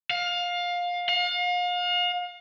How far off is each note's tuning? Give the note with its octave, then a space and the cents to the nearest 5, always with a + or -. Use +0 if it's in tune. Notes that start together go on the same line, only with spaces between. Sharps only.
F5 +20
F5 +35